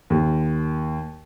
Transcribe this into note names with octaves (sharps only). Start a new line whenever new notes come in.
D#2